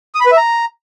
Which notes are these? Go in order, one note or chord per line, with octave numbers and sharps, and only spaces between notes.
D#6
B5
B4
E5
A#5